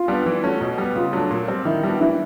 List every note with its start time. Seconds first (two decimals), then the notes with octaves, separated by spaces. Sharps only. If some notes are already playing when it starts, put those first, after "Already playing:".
Already playing: F4
0.08 G3 B3 D4
0.26 E3
0.43 A3 C#4 F#4
0.61 B2
0.78 G3 B3
0.96 C#3 F4
1.13 F#3 A3 D4
1.31 A#2
1.48 G3 C4 F4
1.65 D#3 E4
1.83 G3 B3 D4 F#4
2.00 E3 E4